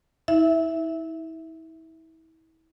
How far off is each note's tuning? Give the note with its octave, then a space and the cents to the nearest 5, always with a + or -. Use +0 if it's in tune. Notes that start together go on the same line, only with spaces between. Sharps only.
E4 -35 E5 +0